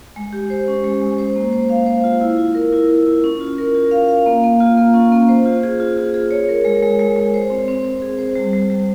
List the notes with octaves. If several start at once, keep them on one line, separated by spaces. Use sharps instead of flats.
G#3
G4
C5
C#4
G#3
G#3
C5
A#3
C5
F5
C5
F4
E4
E4
A#4
E4
E4
E4
C#4
F4
A#4
F4
F5
F5
A#3
A#3
F4
A#3
C#4
A#3
C5
F4
G#4
F4
F4
G#4
C#5
A#4
G#3
G#3
G#3
G#3
C5
C4
C4
C4
G#4
C5
G3
G3
G3